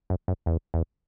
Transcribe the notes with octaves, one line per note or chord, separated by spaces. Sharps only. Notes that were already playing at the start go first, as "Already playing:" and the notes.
F#2
F#2
E2
E2